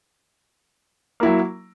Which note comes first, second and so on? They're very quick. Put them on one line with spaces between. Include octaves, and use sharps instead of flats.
A#3 E4 F#3